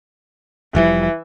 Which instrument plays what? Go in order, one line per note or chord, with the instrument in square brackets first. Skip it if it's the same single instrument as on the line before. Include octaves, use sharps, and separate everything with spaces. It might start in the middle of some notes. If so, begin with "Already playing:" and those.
[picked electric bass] F1 F3 G3 [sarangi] E3